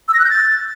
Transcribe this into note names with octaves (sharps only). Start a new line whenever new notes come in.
E6
A#6
F#6
G6
A6